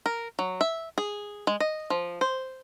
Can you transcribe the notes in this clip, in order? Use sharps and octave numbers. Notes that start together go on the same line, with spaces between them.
A#4
F#3
E5
G#4
G#3
D#5
F3
C5